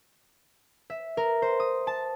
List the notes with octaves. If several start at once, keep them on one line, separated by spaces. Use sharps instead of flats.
E5
A#4
C5
D#6
A5